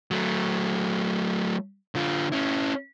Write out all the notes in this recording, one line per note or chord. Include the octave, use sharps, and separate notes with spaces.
F#3 A3
D3 F4
C#4 E4